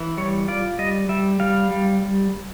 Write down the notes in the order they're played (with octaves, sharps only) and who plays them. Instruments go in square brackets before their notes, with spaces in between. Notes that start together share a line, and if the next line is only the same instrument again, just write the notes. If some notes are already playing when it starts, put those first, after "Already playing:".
Already playing: [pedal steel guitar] E3
G3 C#5
F4 D5
G3 D#5
G3 E5
G3 F5
G3